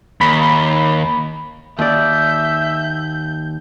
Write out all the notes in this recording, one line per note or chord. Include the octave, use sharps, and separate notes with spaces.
D#2 B5
D#2 D5 E5 G6